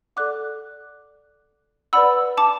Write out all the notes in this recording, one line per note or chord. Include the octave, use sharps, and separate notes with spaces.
A4 D5 F#5 D6 F#6
B4 D5 F#5 B5 E6
A5 D6